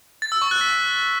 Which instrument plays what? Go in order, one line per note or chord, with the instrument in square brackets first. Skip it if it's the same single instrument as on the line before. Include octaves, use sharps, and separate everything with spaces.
[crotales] A6
E6
C#6
F#6
B6